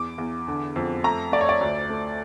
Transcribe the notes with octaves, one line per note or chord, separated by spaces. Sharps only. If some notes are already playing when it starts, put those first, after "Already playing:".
Already playing: E2 D6
E2
D3
F2
A3 A#5
A3 D5
C#5
D5
D2
A3